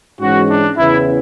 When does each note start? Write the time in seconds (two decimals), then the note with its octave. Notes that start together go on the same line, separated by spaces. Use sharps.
0.21 G#2 E3 G#3 C#4 F#4
0.50 D4
0.77 E2 C#3 E3 B3 E4